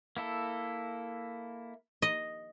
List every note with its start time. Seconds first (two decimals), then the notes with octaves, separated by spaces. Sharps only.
0.17 A#3 E4 A4
2.02 D#5